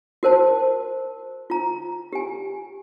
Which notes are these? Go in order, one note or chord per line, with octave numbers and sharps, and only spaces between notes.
F#4 A#4 C5 A5
F4 A#5
G4 G#5